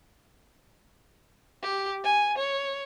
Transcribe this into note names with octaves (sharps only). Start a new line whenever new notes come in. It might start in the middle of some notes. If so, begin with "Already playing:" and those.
G4
G#5
C#5